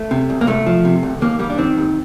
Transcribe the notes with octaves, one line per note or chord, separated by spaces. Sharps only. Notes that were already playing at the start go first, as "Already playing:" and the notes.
Already playing: A3
C3
C2
A#3
C2 A3
F3
C3
C2
D#2 A#3
G3 A#3
D4
D#3 C4
D#2